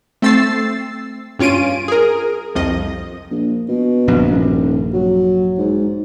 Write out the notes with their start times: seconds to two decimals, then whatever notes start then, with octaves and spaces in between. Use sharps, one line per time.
0.22 A3 C4 E6 A6 C7
1.39 G2 C#4 F4 D7 D#7
1.88 G#4 A#4
2.55 C2 F2 F3 D#5
3.31 A#1
3.69 B2
4.08 A#1 G2 C3
4.30 D#1
4.94 F#3
5.58 G#2